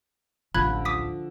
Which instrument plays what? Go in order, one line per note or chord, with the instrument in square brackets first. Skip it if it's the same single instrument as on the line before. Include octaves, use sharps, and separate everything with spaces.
[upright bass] D1 A1 [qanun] D3 F3 [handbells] B5 F#6 G#6
[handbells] D6 D#6 B6